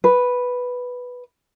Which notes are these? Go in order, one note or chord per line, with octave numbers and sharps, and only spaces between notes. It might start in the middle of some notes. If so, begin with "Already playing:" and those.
B4